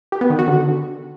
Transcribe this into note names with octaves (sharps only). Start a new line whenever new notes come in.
G4
B3
D#3
F#4
D3